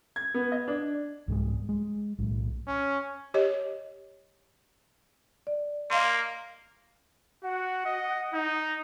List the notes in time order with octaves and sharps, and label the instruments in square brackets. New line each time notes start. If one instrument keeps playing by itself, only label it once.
[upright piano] G#6
B3
D#5
D4
[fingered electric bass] C2 G#2 F3 G#3
G#3
B1 A2
[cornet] C#4
[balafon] G4 C#5 D#5
[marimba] D5
[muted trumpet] A#3 [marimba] D#5 F5 C6
[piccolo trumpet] F#4 [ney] F#5
[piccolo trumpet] D#5
D#4